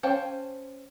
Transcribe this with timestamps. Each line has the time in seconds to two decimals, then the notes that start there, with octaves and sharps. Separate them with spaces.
0.03 C#4 C5 F5 G5 A5